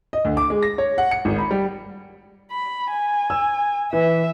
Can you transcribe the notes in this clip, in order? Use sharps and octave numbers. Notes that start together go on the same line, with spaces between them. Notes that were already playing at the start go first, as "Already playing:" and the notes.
D#5
D2
D6
G#3
A#6
C#5
F#5
C#7
G#1
B5
G3
B5
G#5
E6
E3 E5